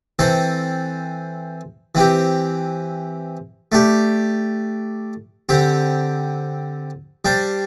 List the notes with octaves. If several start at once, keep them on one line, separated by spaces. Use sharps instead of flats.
E3 C4 A4 C5
E3 C4 G4
A3 D4 G4
D3 C4 G4
G3 D4 C5